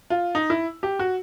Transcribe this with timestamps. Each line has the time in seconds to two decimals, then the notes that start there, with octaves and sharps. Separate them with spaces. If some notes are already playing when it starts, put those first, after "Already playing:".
0.10 F4
0.35 D#4
0.50 E4
0.83 G4
0.99 F#4